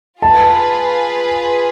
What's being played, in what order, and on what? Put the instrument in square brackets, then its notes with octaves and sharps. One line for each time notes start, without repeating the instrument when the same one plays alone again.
[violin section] F4 G#4 B4 [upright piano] A5